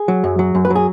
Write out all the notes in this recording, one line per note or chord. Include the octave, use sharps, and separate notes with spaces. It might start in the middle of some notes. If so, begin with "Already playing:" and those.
Already playing: G#4
F#3
F#2
F#3
F#2
B4
F#3
G#4